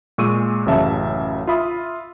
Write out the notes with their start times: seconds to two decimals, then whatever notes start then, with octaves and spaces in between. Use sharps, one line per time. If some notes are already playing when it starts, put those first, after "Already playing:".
0.18 A#2 G#3 C#6 E6 D#7
0.66 A1 F#2 C#3 E5 A5
1.47 F4 E5 B5 D#6